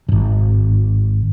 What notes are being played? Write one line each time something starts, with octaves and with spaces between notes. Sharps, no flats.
D1 G#1